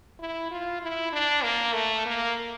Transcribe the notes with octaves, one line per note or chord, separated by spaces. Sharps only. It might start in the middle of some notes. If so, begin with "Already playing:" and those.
E4
F4
E4
D4
A#3
A3
A#3